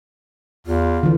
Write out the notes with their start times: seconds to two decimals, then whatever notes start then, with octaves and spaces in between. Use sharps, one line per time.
0.67 E2 F4
1.03 D3 E3